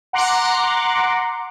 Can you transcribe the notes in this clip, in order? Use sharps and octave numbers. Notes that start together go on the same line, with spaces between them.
F#5 A#5 C6 D6